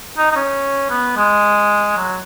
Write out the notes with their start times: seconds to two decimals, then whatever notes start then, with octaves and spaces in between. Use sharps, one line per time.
0.18 D#4
0.31 D#4
0.36 C#4
0.90 B3
1.17 G#3
1.97 F#3